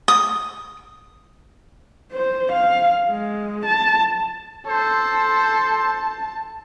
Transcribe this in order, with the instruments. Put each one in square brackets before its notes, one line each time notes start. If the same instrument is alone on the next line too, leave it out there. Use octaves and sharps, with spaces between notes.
[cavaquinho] D#6
[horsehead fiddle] C5
F5
G#3
A5
[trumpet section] A4 C5 [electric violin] A5